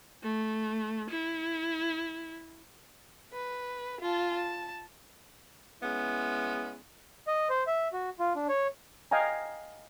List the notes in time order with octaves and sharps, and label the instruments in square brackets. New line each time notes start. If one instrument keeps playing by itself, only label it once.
[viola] A3
E4
[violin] B4
F4 A5
A5
[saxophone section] G#3 B3 C#4 E4
[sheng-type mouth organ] D#5
C5
E5
F#4
F4
D4
C#5
[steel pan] D#5 F5 G5 G#5 A#5